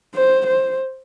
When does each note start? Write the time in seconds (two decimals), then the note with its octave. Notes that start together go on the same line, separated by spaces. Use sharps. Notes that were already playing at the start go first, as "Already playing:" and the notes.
0.15 C5
0.47 C5